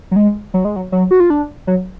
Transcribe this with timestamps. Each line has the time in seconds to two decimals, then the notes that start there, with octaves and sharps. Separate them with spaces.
0.11 F#3
0.16 G#3
0.54 F#3
0.65 G#3
0.76 F#3
0.92 F#3
1.11 F#4
1.20 F4
1.30 D4
1.67 F#3